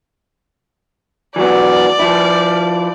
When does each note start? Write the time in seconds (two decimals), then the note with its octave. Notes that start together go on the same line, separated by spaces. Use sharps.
1.36 E3 F#3 B3 D5
1.99 F3 E4